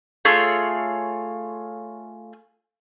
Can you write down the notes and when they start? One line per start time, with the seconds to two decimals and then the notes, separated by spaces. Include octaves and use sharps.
0.25 A3 F4 G#4 C#5